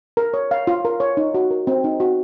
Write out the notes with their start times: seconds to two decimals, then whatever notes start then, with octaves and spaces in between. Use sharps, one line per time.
0.17 A#4
0.34 C#5
0.51 F5
0.67 F4
0.85 A#4
1.00 C#5
1.17 D#4
1.34 F#4
1.51 A#4
1.67 C4
1.84 D#4
2.00 F#4